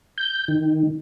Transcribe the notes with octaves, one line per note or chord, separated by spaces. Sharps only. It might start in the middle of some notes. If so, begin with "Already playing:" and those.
G6
D#3